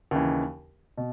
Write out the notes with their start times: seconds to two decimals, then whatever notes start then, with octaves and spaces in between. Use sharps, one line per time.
0.11 D#2 C#3 E3
0.97 B2